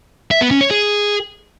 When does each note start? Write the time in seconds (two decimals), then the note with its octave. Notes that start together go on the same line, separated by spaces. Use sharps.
0.31 E5
0.41 B3
0.51 C#4
0.61 C#5
0.71 G#4